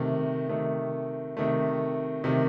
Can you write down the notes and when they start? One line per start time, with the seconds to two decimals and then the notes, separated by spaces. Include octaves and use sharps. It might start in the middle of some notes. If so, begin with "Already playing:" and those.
Already playing: C3 D#3 A3
0.49 C3 D#3 A3
1.37 C3 D#3 A3
2.24 C3 D#3 A3